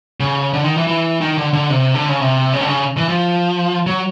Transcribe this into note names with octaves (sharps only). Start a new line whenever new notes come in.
C#3
D3
D#3
E3
E3
D#3
D3
D3
C3
D3
C#3
C3
C#3
D3
C#3
E3
F3
F#3